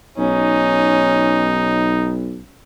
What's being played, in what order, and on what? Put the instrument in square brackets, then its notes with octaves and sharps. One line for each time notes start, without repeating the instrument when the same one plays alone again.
[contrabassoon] B1 [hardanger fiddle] C#4 [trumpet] D#4